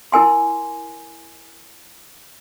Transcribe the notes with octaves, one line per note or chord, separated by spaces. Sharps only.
E4 A#4 G#5 C6